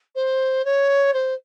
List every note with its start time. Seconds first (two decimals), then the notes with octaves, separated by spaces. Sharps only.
0.15 C5
0.65 C#5
1.13 C5